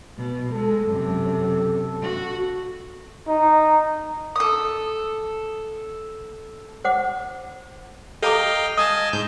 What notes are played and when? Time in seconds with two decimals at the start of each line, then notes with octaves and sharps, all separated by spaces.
0.18 B2
0.53 G#3 A4
0.86 F#2 C3
2.02 F#4
3.28 D#4
4.36 A4 D#6
6.84 C5 F#5 D6
8.22 A4 D#5 F5 G5 A#5 D6
8.77 D#5 G#5 A5 D#6
9.13 G#2 G6